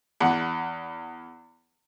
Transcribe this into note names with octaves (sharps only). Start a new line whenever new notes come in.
E2 F#5